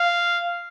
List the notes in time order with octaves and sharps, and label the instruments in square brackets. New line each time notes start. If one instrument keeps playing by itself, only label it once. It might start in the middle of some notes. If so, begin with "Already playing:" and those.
Already playing: [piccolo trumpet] F5